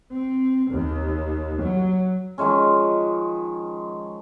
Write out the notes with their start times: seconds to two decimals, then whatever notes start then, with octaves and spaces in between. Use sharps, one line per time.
0.13 C4
0.71 D#2
1.62 F#3
2.38 D#3 F3 G#3 C#4